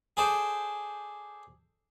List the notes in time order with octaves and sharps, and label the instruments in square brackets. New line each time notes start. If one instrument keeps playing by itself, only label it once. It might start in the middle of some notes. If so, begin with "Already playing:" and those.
[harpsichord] G#4 A4 C5 D5